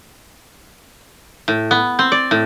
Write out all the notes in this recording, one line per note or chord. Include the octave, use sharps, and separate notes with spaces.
A2
B3
C4
D5
A2